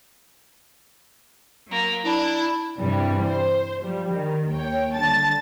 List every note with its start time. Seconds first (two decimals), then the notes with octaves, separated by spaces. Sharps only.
1.67 F#3 A#3
2.04 D4 E4
2.79 G2 C3 E3 G3
3.25 C5
3.80 F3 G3
4.11 D#3
4.52 D#2 C#5 G5
4.95 D3 G3 A5 A6